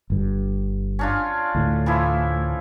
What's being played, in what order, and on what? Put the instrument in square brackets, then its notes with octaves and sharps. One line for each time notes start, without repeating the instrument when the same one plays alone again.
[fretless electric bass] G1 G2
[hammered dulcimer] C#4 D4 F4
[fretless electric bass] D2 A2
[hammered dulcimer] E3 F3 E4